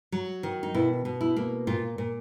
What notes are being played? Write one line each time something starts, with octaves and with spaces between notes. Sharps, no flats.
F#3
D#3
D#4
B2 E4
B2
E4
A#3
A#2 F4
A#2